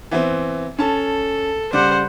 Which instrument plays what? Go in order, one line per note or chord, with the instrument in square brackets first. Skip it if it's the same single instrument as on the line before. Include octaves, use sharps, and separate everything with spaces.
[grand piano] E3 B3 C4
[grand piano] C#4 A5 [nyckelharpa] A4
[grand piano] C#3 G3 D6 [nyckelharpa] C5 F#5